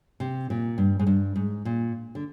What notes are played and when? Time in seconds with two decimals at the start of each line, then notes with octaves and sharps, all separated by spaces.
0.20 C3
0.50 A#2
0.78 G2
1.00 G#2
1.07 G2
1.36 G#2
1.65 A#2
2.15 D3